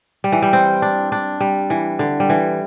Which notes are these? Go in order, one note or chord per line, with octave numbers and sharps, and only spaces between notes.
G3
E3
G3
C4
D4
D4
G3
E3
D3
G3
E3